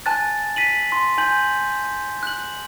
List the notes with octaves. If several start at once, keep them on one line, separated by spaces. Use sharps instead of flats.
G#5 A5 F#6 A6
B6 D#7 F#7
C6
G#5 G6 F#7
F#6 F#7